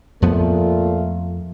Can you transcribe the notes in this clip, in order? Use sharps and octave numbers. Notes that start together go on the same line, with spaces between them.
F2 A#2 F3 A3 B3 F4